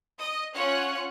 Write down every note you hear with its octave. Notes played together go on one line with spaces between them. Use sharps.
D#5 D#6
C#4 F4 C#5 F#5 F#6